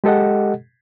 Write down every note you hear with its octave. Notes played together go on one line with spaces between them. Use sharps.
G#3 G4 A4 D#5 F#5